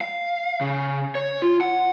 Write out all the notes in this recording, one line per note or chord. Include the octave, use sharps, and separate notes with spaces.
F5
C#3
C#5
F4
F#5